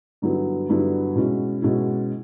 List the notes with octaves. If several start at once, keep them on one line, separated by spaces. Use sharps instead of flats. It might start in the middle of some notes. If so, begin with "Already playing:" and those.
G2 D3 F#3 B3 E4
G2 D3 F#3 B3 E4
B2 G#3 C#4 E4
B2 G#3 C#4 E4